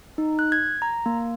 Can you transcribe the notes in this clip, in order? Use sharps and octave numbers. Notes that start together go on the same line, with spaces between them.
D#4
F#6
G#6
A#5
A#3